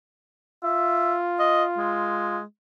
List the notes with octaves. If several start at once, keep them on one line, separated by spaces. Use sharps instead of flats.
F4 E5
D#5
G#3